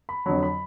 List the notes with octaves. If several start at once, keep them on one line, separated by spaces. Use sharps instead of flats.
B5
F2 D3 F#3 B5
B5